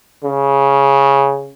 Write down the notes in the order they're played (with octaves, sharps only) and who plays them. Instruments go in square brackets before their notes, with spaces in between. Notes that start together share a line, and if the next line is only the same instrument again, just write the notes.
[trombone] C#3